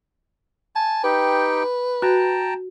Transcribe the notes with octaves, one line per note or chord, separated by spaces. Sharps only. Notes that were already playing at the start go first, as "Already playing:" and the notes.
G#5 A5
D#4 G4 B4 G5
F#4 G5 A5 A#5